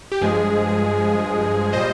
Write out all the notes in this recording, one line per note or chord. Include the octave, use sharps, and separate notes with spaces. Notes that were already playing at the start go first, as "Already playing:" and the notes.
G4
G2 F3 G#3 G#4
A#2 G3 C5 D#5